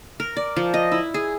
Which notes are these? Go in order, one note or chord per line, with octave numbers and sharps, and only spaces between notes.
A#4
D5
F3
D#5
E4
G#4